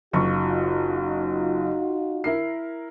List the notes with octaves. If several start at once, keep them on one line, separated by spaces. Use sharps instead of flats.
F#1 D#4 F4 F#4 C#6
E4 A#4 C7